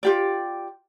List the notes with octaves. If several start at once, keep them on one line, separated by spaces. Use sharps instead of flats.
F4 G4 D5